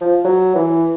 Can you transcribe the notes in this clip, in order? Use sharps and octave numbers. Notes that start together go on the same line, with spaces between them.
F3
F#3
E3